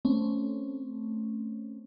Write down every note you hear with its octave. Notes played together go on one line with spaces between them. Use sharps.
A3 C4 C#4